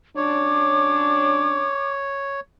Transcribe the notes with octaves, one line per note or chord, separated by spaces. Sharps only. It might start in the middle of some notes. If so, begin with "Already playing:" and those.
F#3 C#4 D4 C#5 D6